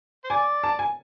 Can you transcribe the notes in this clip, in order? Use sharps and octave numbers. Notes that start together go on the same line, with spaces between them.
C5
D5 G#5
A5
G#5